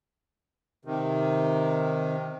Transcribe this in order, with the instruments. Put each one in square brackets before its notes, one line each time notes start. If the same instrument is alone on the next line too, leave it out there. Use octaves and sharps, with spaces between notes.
[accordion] C3 D#3